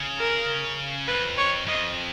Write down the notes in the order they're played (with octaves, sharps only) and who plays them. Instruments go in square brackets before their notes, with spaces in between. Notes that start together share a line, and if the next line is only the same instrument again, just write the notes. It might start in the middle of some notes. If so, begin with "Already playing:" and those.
Already playing: [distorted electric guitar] C#3
[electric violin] A#4
[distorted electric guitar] F2 [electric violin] B4
[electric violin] C#5
[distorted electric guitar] F2 [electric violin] D#5